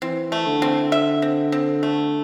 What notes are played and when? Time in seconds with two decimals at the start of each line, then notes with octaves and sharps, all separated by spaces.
0.02 E3 C4
0.32 A3
0.46 D3
0.62 C4
0.92 E5
1.22 C4
1.52 C4
1.83 A3